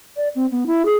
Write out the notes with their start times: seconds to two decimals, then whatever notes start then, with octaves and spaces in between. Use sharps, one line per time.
0.17 D5
0.35 C4
0.51 B3
0.67 E4
0.85 G#4